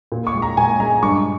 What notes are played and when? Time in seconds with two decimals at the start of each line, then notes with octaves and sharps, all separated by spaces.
0.12 A#2
0.27 C#6
0.34 G#3
0.42 A#5
0.57 A#2 G#5
0.80 G#3 A#5
1.02 G2 C#6